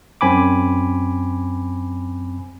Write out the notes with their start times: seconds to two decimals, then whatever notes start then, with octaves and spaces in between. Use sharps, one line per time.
0.21 F#2 C4 G#5 B5 D6